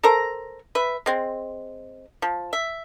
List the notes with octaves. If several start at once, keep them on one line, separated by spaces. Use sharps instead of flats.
A4 A#4 C5 A#5
B4 E5
G#3 C4
F3
E5